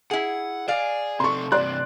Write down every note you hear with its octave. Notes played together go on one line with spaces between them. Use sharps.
E4 G#4 F#5
G#4 D5 F5
C3 A4 C6 C#6
G2 C3 D5 C6 F#6